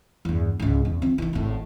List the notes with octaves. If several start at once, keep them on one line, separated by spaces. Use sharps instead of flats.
E2 G2
C#2 G#2
E2
F3 C4
D#3 E3
G#1 A2